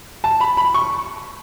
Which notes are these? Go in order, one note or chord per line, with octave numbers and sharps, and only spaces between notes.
A5
B5
B5
C#6